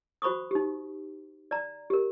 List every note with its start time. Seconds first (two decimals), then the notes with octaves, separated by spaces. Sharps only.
0.22 F#4 C5 B5 C#6 D#6
0.51 D#4 G4
1.51 D5 A#5
1.90 G4 A#4